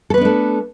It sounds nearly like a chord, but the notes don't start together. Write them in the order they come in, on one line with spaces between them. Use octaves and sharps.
A4 B4 B3 D4 A3